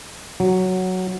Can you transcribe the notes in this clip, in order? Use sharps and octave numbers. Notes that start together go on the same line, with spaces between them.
F#3